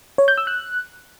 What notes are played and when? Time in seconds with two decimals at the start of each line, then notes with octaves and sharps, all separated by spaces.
0.18 C#5
0.28 G6
0.38 E6
0.47 F#6